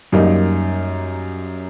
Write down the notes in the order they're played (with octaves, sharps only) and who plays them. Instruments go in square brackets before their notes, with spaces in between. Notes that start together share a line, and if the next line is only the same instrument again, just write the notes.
[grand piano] F#2 G3 A#3 D#4